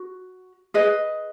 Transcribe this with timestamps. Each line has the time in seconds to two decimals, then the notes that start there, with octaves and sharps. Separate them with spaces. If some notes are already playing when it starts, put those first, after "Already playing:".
Already playing: F#4
0.74 G#4 B4 D#5